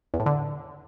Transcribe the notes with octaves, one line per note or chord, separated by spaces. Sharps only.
E2
A2
D3